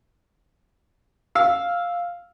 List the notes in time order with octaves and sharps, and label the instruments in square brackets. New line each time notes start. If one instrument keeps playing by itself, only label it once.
[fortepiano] F5 E6